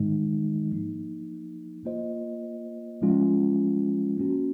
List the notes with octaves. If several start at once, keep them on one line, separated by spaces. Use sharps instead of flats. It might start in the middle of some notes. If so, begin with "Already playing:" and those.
Already playing: G#2 D#3 G#3 D#4
F3 A#3 D#4
A#3 F4 C5 D#5
F3 G#3 C#4 F4
A#3 C#4 F#4